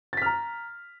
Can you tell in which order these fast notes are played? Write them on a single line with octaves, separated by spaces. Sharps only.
A6 B6 F6 A#5